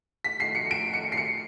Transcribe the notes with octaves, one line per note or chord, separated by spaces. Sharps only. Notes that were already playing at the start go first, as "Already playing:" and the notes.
B6
C7
C#7
D7
C#7
C7
C#7